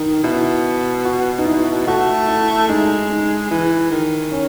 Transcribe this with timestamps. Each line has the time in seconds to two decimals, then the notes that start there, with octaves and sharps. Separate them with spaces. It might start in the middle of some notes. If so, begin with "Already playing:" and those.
Already playing: D#3 D#4
0.23 B2 E4
1.05 F#4
1.38 D#4
1.46 E4
1.87 A3 F#4
2.28 E4
2.68 G#3 D#4
3.10 D#4
3.50 E3 E4
3.91 D#3
4.32 C#4